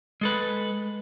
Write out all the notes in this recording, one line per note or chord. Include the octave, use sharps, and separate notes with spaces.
G#3 A4 B4